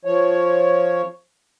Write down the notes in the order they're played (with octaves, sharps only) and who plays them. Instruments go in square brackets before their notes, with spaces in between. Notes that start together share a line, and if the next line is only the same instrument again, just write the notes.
[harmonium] F3 C#5